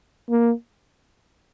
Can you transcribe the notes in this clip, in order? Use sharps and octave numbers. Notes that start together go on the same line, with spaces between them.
A#3